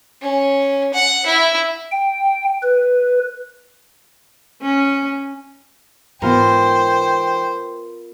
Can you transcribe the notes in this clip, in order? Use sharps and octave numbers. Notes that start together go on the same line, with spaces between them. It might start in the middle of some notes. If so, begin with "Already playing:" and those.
C#4
F#5
E4
G5
B4
C#4
G#2 E3 B3 F4 A#4 C5 G5